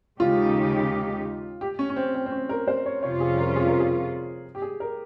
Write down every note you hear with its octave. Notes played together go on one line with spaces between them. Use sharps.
D#2 C#3 G#3 D#4 F4 G4
G4
C#4
C#4
C4
C4
C4
C#4
A#4
C5
C#5
F2 C3 G3 C#4 F4 C#5
G#4
A#4
G#4
A#4
G#4
G4
G#4
A#4